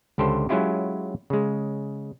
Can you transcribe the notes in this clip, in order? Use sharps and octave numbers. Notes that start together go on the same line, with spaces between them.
C#2 D3 G4 A4 C5
F#3 G#3 C#4 E4 F4 G4
C#3 G#3